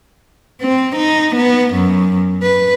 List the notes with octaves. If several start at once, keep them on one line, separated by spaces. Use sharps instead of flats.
C4
D#4
B3
F#2
B4